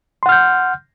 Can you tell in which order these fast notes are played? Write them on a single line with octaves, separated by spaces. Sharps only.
C6 F#5 F6 G6